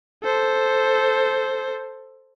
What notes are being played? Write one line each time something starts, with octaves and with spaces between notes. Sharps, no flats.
A4 C5